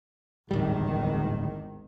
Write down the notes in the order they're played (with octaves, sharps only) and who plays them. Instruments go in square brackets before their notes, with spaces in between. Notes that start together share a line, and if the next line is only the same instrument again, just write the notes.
[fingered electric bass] D1 G3 [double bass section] G#1 E2 D#3